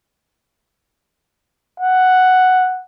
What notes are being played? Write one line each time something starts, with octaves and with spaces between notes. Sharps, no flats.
F#5